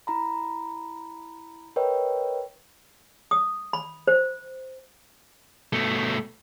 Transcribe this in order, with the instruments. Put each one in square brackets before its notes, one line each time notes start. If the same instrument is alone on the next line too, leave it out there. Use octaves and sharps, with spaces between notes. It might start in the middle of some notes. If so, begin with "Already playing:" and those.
[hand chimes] E4 A#5 B5
A#4 B4 C#5 D#5 G5
[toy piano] D#6
B5
C5
[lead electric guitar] B2 A3